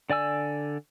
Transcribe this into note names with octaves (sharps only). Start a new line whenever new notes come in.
D3 D5 G#5 E6